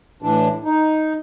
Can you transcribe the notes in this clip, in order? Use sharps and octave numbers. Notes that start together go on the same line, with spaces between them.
A2 E3 D4
D#4